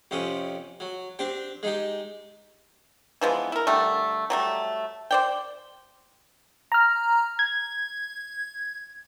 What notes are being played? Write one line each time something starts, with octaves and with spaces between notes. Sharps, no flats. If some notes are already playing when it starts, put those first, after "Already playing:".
F2 C3 C#4 D#6
F#3
C4 D4 G4
G#3 D#4 G4
E3 F3 G#3 B3
E4 A#4
D3 G3 A3
F#3 G3 A3
C5 D5 G5
A#5 F6
G#6